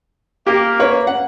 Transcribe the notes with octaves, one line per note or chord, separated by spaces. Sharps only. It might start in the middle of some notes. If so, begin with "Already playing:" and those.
A#3 G4
B4 C#5
F#5